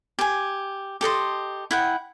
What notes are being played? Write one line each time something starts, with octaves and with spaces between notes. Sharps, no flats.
G4 G#5
G4 A4 D#5 C6
E4 F#5 G5